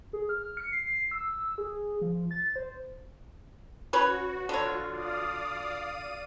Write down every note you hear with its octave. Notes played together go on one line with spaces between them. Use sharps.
G#4
F6
C#7
C7
E6
G#4
F3
A6
C5
C#4 F#4 B4 C#5
D3 F4 C#5
D5 F5 D#6
D#7